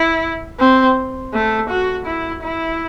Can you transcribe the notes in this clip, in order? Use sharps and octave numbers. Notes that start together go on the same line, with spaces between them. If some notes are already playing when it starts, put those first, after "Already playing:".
Already playing: E4
C4
A3
F#4
E4
E4